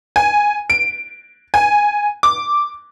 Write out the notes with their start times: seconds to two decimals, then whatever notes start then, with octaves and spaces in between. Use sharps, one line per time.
0.16 G#5
0.70 D7
1.54 G#5
2.23 D6